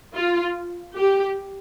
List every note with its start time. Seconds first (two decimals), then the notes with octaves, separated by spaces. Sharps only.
0.17 F4
0.97 G4